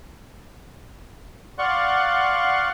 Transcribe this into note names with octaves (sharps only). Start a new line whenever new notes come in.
D5 F5 F#5 C6 C#6 F#6